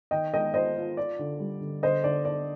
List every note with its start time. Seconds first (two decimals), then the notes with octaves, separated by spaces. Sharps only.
0.11 D#3 D#5 G5
0.33 G#3 D#5 G5
0.54 F4 C5 D#5
0.76 F4
0.97 F4 D5
1.19 D3
1.39 G3
1.61 D3
1.83 D3 C5 D#5
2.04 D3 D5
2.25 D4 D5